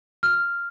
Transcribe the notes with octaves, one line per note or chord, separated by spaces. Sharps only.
F6